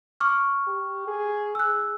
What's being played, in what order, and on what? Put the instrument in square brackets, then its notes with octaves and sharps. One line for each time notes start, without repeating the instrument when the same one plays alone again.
[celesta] C#6 D6 F6
[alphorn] G4
G#4
[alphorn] G#4 [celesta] E6 F#6